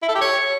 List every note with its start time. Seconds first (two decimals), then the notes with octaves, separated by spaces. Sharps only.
0.02 E4
0.09 A4
0.15 G4
0.21 C#5